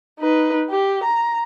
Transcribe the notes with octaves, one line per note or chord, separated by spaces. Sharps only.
D#4 B4
G4
A#5